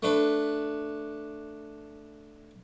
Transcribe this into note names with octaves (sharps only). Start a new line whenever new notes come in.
A3 D4 B4